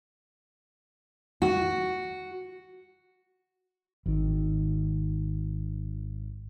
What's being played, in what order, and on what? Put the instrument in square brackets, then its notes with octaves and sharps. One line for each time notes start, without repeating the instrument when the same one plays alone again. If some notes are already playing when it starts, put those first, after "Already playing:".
[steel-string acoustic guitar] F#4
[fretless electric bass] G#1 D#3